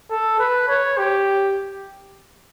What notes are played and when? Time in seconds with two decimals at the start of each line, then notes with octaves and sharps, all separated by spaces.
0.10 A4
0.39 B4
0.69 C#5
0.98 G4